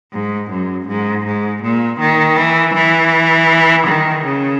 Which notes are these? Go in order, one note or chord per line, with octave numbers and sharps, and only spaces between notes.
G#2
F#2
G#2
G#2
A#2
D#3
E3
E3
D#3
C#3